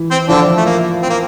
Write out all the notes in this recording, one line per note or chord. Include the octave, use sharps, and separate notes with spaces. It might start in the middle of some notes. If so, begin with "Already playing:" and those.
Already playing: E3
C4 C5
D3 F3 D4
A3
A#3
C4
A#3